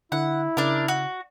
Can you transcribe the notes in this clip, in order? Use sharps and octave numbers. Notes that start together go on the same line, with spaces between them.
D3 E4 F#5
C#3 D4 A#4
F#4